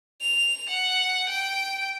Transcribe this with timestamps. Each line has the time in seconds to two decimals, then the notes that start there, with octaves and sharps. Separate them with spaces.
0.21 F7
0.69 F#5
1.29 G5